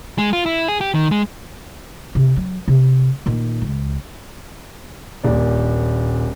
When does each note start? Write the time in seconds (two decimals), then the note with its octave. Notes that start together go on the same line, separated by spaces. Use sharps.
0.18 G#3
0.33 F4
0.46 E4
0.68 G#4
0.81 G4
0.94 D#3
1.11 G#3
2.15 C3 C#4
2.36 F#3
2.68 C3
3.26 A#2 D#3
3.61 C#2
5.24 D#1 A#1 D5